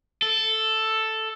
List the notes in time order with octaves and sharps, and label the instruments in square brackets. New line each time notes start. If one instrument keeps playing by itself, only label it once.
[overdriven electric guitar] A4